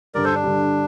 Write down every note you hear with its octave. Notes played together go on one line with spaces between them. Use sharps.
G2 D3 G3 A#4 D5
A4 C5
D4
G2 D3 G3